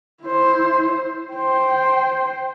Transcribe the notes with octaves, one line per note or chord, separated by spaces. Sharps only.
E4 C5
C5 G5